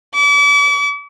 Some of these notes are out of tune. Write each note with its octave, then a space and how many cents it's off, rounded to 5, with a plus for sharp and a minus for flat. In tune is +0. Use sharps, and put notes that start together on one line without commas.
D6 -40